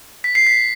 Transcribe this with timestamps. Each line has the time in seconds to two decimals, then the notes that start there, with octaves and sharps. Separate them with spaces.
0.24 B6
0.35 C7
0.47 B6